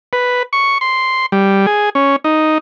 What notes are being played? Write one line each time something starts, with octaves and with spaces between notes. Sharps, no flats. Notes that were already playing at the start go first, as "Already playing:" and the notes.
B4
C#6
C6
G3
G#4
C#4
D#4